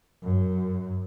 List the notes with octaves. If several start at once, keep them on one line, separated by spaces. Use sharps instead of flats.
F#2